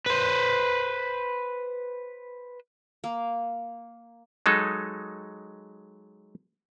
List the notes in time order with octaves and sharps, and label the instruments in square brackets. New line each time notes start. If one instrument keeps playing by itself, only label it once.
[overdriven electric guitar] B4 C5
[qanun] A#3
[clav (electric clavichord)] F#3 G#3 D#4 A4